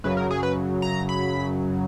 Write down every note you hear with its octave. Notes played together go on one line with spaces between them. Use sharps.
F#2 C#3 F#3 B4
A#4
G#4
B4
A#5
B5